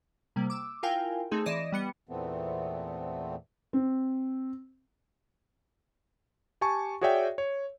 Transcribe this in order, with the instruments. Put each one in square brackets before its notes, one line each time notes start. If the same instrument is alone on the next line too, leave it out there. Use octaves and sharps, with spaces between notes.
[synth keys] C3 G3 A#3
D6 E6
E4 F4 A#4 F5 G5 G#5
A3 C4 D#4 G#4
E3 D5 D#5 A#6 E7
G3 B3 C#7
[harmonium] E2 A#2 E3 A3 B3 C4
[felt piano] C4
[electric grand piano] G4 G#5 A5 C#6
F#4 G#4 C#5 D5 E5 G5
C#5